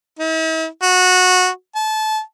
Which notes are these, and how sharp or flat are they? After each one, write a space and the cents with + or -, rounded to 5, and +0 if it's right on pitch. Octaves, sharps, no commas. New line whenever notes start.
E4 -45
F#4 -15
A5 -25